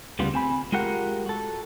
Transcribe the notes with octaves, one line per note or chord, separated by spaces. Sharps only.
D2 C#3 G3 B3 F4
C4 G#5 B5
G#3 F4 G4 A#4 F#5
F#4 A4